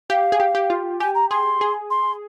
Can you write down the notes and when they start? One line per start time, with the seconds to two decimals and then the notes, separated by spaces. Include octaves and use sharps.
0.10 G4 F5
0.32 G#4
0.40 G4
0.55 G4
0.70 F4
1.00 G4 G#5
1.15 A#5
1.30 G#4 C6
1.61 G#4
1.91 C6